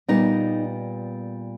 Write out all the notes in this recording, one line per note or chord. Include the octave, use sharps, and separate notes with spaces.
A#2 G3 B3 D#4